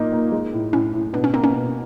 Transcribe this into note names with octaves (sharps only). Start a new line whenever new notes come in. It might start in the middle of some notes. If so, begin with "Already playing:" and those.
Already playing: A#2 A#3 D#4
A#3
G#3
A2
A2 C#4
A2
B2 D4
C#4
A#3 C4
C#4
B2